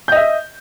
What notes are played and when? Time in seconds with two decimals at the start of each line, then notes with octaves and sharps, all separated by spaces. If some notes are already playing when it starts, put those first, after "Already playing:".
0.08 G6
0.12 D#5
0.16 E5